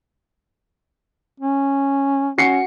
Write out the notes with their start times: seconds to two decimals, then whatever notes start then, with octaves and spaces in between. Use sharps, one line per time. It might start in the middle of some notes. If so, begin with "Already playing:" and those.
1.40 C#4
2.38 C#4 F#4 C7 C#7